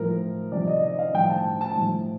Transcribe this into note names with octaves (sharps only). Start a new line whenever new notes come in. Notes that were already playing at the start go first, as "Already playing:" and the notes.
Already playing: A2 F3 A#4
C3 F3 D5
D#5
D#5
F5
A2 F3 G5
A5
A5
A2 F3